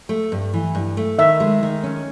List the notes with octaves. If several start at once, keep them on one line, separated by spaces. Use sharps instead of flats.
A3
G2
E3
G2
A3
D#3 E5
G#3
D#3
C#4